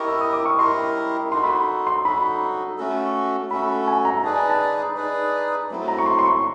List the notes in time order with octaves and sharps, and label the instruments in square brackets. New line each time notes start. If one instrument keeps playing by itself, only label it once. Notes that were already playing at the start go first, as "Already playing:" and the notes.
Already playing: [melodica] E4 G4 A#4 D#5 [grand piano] C#6
[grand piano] E6
D#6
D6
C#6
[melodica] E4 G4 A#4 D#5 [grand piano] C6
[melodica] D#4 F#4 A4 [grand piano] C6
[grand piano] B5
C6
C6
[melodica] D#4 F#4 A4 [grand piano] B5
[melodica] A3 C#4 F#4 A4
[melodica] A3 C#4 F#4 A4 [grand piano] B5
[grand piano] G#5
A#5
[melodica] D#4 G#4 B4 D5 [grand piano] A5
[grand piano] G#5
A5
[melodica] D#4 G#4 B4 D5
F#3 A3 C4 E4
[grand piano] A#5
C#6
C6
C6
C#6